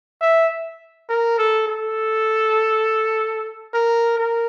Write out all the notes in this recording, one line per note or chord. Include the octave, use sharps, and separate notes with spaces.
E5
A#4
A4
A4
A#4
A#4